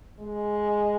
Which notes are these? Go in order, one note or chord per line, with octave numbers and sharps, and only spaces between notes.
G#3